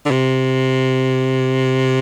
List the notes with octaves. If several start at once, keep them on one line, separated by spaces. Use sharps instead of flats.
D3
C3